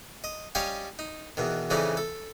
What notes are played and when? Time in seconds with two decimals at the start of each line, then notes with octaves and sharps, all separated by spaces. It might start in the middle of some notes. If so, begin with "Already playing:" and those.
0.24 D#5
0.55 G3 C#4 C#5 D#5 F5 G5
0.99 D#4
1.37 E2 B2 D#3
1.70 F2 C#3 E3 D#4 D5
1.97 A4